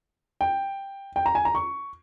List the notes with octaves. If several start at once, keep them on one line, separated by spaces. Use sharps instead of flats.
G5
G5
A#5
G#5
A#5
C#6